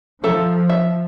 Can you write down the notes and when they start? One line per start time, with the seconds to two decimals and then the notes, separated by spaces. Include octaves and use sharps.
0.24 F3 A4 E5 A#5
0.69 E5